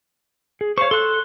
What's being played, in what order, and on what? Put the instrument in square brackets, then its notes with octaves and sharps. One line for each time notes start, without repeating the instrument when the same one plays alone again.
[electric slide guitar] G#4
[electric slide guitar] C5 C#5 [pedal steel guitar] F5 C#6
[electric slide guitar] A4 [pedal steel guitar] C6 F#6